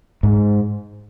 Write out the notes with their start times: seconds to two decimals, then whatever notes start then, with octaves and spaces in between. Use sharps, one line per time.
0.23 G#2